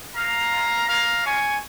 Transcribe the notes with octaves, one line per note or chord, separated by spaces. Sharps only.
A#3 D#4 F5 A#5
G#3 F4
A#3 C#4 F4 F5 A#5
G#3 C#4 F4 G#5 C#6